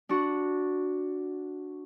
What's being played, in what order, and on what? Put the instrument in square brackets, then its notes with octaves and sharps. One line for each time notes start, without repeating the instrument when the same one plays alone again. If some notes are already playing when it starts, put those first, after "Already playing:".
[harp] D4 F#4